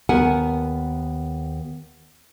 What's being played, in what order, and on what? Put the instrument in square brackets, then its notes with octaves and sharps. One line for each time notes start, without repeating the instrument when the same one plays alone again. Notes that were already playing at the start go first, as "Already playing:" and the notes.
[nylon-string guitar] D#2 B3 A#4 F#5 G#5